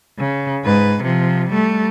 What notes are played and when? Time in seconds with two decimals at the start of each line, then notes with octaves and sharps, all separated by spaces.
0.19 C#3
0.65 G#2 B4
1.03 C3 F3
1.49 G3 A3